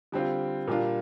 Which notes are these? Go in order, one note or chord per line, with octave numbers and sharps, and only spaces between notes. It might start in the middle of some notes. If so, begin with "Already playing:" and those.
D3 G3 C4 F4
A#2 G3 D4 F4